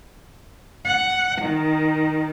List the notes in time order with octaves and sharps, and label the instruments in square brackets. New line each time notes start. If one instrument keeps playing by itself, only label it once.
[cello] F#5
D#3